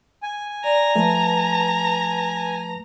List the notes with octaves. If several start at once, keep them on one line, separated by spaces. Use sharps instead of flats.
G#5
D5 A#5
F3 A3 B4 A5